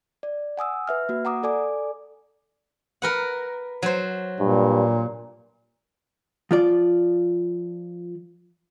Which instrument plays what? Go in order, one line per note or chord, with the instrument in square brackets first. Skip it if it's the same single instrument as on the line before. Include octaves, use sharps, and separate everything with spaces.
[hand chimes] D5
F#5 G#5 D#6 E6
B4 E5 F6
A#3 F#4
F#5 A#5 D6 D#6
A4 D5 G#5 D6
[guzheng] A#4 B4 F#5
F#3 C5
[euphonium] G2 [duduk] A#2
[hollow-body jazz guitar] F3 F4 D5